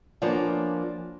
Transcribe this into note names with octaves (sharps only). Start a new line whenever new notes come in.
F3 A#3 B3 C#4 D4 F4